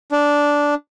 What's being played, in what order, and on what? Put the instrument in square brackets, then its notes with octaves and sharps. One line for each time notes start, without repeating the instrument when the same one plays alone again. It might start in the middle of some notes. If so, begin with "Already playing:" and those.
[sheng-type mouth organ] D4